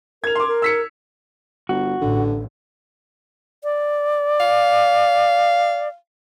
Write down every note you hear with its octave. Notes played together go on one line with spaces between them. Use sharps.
A#4 G#6 F7
C6 D6
A#4
E6 B6 C#7
G1 F#4
A1 D3
D5
F5